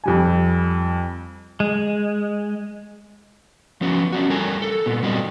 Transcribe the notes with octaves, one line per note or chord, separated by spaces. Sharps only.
F2 G3 G#5
G#3
F3 F#3 B3 C#4 F#4
C#4 D4 F#4
G3 A4 A#4 G#5
A4
A#2 B3
F#3 G3 C4 D4 D#5